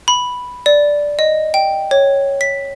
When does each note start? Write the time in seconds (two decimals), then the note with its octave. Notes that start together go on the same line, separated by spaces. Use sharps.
0.08 B5
0.66 D5
1.19 D#5
1.54 G5
1.91 C#5
2.41 B6